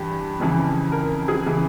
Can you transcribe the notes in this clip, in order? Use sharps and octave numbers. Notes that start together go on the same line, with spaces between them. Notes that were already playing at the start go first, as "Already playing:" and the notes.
Already playing: G2 E3 G4
F2 C#3 E3
A#4
G#4
C#3 E3